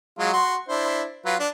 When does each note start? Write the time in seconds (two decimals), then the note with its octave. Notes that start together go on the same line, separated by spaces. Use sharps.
0.19 F#3 G#3 F4
0.33 F#4 C6
0.69 D4 E4 C5
1.26 F#3 F4 B4
1.39 D4